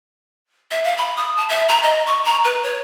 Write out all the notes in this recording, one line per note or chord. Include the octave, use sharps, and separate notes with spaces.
E5
F5
B5
D#6
A5
E5
A#5
D#5
C#6
A#5
B4
C#5